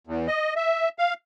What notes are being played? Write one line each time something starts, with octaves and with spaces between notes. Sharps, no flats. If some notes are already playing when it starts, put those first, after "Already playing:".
E2
D#5
E5
F5